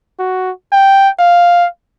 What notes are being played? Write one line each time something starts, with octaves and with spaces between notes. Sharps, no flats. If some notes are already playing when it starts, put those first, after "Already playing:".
F#4
G5
F5